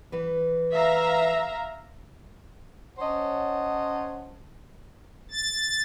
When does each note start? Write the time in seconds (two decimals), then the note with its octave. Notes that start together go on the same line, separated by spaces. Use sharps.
0.12 E3 B4
0.73 E5 F5 A#5
2.99 C#4 C5 C#5 D#5 F#5 A5
5.31 A6